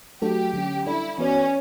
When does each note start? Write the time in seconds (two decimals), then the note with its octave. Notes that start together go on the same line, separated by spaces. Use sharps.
0.22 F#3 A3 D4 F#4 G4 A4
0.53 D3 F#3 C#4
0.86 G3 D4 E4 A4 D5
1.18 E3 B3 C#4 F#4 B4 D5